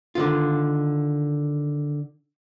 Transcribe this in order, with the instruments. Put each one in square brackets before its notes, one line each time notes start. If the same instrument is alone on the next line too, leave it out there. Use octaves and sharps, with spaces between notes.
[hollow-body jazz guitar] D3 D#3 F4